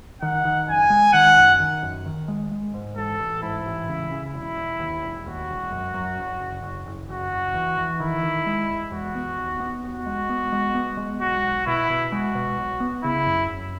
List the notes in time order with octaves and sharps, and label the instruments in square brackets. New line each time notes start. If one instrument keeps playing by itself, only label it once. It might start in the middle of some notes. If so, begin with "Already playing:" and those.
[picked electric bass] D#3 [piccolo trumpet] F#5
[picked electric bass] D#3
[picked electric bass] F#1 [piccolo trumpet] G#5
[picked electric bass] G#3
[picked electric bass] D#3 [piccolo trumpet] F#5
[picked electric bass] F#2
D#3
F#2
D#3
G#3
G#3
G#2
[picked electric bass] A1 [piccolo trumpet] A4
[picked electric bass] A1
[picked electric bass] G#2 [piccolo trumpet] E4
[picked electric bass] A1
C#3
C#3
[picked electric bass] E1 [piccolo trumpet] E4
[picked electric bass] E1
D#2
E1
[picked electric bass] D#2 [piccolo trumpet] F#4
[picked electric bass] E1
F#2
F#2
F#1
F#1
F#1
F#1
[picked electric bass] F#1 [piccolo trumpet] F#4
[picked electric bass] F#1
E2
E2
[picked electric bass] D#3 [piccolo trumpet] E4
[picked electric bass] D#3
G#3
E2
[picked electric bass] E2 [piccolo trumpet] F#4
[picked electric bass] B3
D#2
B3
[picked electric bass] D#2 [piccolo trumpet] F#4
[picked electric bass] G#3
B3
G#3
B3
G#3
[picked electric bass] B1 [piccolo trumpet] F#4
[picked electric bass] B1
[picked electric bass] B2 [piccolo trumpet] E4
[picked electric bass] B2
[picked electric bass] G#3 [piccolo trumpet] F#4
[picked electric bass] B2
B1
B3
[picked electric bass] C#3 [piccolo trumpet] E4
[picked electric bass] F#2
F#2